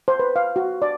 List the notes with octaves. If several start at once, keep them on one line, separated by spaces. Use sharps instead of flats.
C5
B4
F5
F#4
D5